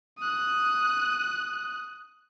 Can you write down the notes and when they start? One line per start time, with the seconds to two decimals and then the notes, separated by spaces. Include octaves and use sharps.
0.19 D#6 F#6